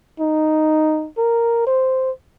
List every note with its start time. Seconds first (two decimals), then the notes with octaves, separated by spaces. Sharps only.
0.20 D#4
1.18 A#4
1.67 C5